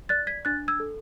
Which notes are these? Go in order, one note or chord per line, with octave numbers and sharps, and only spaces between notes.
D5 F#6 A6
G#6 B6
D4 F#6 A6
E6 G#6
A4